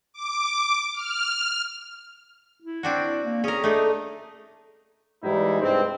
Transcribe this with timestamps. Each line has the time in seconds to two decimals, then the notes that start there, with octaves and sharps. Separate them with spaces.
0.13 D6
0.93 F6
2.62 E4
2.83 C4 D4 F#4
3.23 A#3
3.44 C#4 G#4 A#4
3.64 A3 D4 D#4 G#4
5.23 G#2 E3 G3 D#4 E4
5.61 G2 C3 G#3 C4